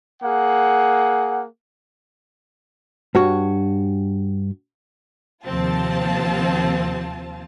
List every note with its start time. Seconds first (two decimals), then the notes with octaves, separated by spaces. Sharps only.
0.23 A#3 G#4 F#5
3.15 G2 F#4 C#5
5.44 D#2 C3 F3 C4 F4 A5